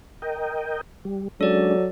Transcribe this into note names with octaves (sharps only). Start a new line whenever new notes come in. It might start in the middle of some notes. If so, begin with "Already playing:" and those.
A#4 D#5 G5
G3
F#3 G#3 C#4 D4 A4 D5